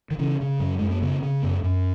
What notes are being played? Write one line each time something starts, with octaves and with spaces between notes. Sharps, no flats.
D#3
C#3 E3
C#3
F#2 F#3
F#2 G#3
A#3
C#3 B3
C#3
F#2 B3
F#2